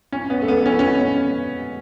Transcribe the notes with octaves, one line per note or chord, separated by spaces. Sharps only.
C#4
B3
A3
B3
C#4
C#4